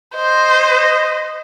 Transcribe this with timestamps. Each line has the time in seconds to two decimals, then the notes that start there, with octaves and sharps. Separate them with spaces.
0.16 C5 D#5